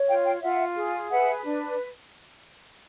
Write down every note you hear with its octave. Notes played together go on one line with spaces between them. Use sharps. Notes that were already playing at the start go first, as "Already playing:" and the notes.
Already playing: C#5
F4 F5 G5
F5 G5
F4 E5 F#5
G#4
B4 E5 F#5
D4